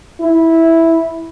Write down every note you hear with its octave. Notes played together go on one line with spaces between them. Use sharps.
E4